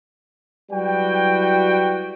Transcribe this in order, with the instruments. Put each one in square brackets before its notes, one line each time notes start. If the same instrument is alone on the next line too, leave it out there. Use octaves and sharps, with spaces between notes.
[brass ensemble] F#3 G3 E4 F#4 B4 G5